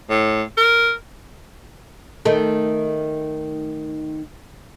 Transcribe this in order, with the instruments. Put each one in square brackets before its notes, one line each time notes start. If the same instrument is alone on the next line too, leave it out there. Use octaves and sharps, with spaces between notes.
[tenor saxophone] A2
A#4
[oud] D#3 A3